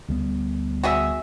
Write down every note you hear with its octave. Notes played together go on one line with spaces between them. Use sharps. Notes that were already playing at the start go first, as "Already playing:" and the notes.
D2 G3 B3
F#4 G#4 E5